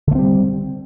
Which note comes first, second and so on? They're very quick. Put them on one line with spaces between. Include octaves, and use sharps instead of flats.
D3 A3 C4 G3